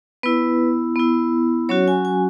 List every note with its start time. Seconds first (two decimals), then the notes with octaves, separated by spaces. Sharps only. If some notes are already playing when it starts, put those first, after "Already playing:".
0.23 B3 E4 B4
0.96 B3 E4
1.69 F#3 C#4 F#4 C#5
1.88 G#5
2.05 G#5